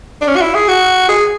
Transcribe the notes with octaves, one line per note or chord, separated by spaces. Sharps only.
D4
C#4
F#4
E4
G#4
F#4
G#4